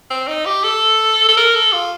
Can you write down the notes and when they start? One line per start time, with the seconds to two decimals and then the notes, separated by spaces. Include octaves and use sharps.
0.10 C4
0.27 D#4
0.45 G4
0.64 A4
1.28 A4
1.37 A#4
1.55 A4
1.72 F4